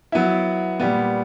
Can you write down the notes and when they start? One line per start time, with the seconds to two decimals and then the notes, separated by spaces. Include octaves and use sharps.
0.12 F#3 B3 E4
0.80 A#2 G3 B3